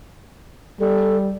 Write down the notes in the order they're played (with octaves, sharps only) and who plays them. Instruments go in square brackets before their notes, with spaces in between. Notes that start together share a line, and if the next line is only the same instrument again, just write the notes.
[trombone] G3 [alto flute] A4